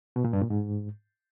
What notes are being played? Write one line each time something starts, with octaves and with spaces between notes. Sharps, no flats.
B2
A#2
G2
A#2
G#2